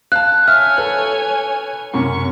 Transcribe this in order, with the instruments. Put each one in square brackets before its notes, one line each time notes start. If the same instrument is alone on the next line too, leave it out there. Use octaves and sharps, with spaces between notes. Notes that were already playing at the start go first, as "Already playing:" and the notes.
[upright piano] F5 A5 [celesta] F#6
[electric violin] C#5 G#5 [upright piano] E5 [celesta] F6
[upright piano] A4 B4 F#6
[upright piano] F#2 C3 C#4 [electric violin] C#6